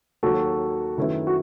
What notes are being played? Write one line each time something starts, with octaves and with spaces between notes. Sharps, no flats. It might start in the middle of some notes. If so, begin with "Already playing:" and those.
D#2 D#3 F#3 F#4 A4
F#2 D#3 A3 E4 B4
F#4